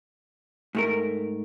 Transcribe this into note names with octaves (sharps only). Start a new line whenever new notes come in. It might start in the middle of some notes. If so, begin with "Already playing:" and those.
G#2 A3 A#4